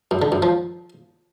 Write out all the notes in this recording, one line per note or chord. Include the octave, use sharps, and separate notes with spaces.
F#2
D3
F#2
F3